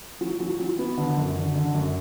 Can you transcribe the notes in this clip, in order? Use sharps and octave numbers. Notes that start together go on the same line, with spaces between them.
F#3
F#3
F#3
B3
D3
F#2
D3
D3
F#2